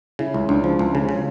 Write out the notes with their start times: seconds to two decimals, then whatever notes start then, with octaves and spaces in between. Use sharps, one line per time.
0.19 C#3 E4
0.34 C#2
0.49 C#2 D4
0.64 F3
0.79 C#2 C#4
0.95 C#3
1.09 C#3